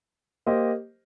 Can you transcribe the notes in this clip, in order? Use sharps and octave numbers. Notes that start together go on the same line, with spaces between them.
A#3 G4 C5 D#5